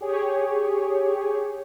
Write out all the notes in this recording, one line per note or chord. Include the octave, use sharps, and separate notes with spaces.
G4 G#4 C#5